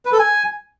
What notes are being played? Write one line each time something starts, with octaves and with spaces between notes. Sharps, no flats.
B4
A4
G#5